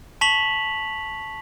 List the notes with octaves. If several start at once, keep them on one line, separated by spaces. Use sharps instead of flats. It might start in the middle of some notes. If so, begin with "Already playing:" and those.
A5 C#6 B6 F7 F#7